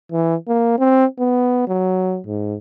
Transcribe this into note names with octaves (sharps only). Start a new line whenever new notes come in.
E3
A#3
C4
B3
F#3
G#2